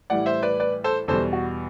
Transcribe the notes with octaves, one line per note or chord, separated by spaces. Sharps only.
A2 E3 G3 D5 F#5
C5 E5
B4 D5
B4 D5
A4 C5
E2 B2 G3 A4 C5
F#4